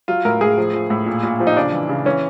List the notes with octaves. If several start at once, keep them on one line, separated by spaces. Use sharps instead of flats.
F#3 F4
A2 A#4
A2 G#4
F3
F3
A2
A#2
A#2
F3
D#4
C#3 D4
E3
C#3
E3 C#4